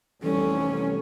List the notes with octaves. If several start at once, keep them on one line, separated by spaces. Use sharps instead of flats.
F1 C2 E3 G3 C#4 A4